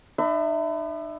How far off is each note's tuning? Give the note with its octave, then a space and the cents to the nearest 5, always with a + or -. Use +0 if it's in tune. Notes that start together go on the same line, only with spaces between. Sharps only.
D#4 -45 E5 +0 B5 +30